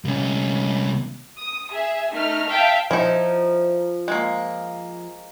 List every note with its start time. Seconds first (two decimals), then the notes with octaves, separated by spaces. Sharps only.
0.05 C2 C#4
1.38 D#6
1.71 G#4 E5
2.13 A3 D#4 F6
2.47 E5 F5 G5 A5
2.91 F3 D#4 E4
4.08 G#3 A#3